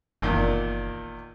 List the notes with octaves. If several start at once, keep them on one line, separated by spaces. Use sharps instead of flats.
F#1 E2 A#2 D#3